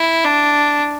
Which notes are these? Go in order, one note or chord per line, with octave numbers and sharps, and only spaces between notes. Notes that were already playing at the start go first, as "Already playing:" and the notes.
Already playing: E4
D4